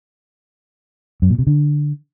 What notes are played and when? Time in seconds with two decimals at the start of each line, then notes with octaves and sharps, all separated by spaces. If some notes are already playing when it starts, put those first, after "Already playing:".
1.22 F#2
1.30 A#2
1.38 C3
1.47 D3